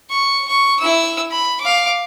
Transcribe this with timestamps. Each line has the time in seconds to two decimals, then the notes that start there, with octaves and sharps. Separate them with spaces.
0.10 C#6
0.48 C#6
0.80 E4 E6
1.31 B5
1.61 F5 D6